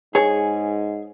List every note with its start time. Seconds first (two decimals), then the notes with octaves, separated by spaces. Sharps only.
0.15 G#2 G#4 C#5 G#5